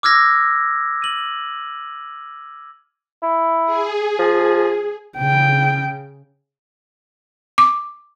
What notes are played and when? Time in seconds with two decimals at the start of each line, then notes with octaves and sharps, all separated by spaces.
0.03 D6 E6 F6 G#6 A#6
1.02 D#7 F#7
3.22 E4
3.65 G#4
4.19 F3
5.17 C#3 G5
7.58 D6